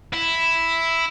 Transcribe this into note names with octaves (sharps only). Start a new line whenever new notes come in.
E4